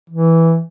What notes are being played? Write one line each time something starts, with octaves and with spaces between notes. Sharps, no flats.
E3